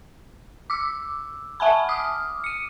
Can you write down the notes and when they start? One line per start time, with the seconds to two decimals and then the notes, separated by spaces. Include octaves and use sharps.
0.70 D6 E6
1.60 E5 F#5 G#5 A5 B5
1.89 D6 D#6 F6
2.44 C#7 D#7